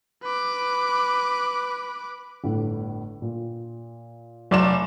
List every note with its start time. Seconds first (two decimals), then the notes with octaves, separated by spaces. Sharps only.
0.23 B4 D6
2.44 G1 A2
3.22 A#2
4.51 F1 F#3 D5 E7